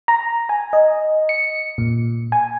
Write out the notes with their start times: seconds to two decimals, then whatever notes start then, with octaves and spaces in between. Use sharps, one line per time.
0.08 A#5
0.49 G#5
0.73 D#5
1.29 C#7
1.78 A#2
2.32 G#5